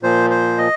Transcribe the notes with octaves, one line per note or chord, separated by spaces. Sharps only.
A#2 F3 C5
C5
D#5